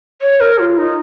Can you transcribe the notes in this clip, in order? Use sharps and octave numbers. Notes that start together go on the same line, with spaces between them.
C#5
A#4
F4
D#4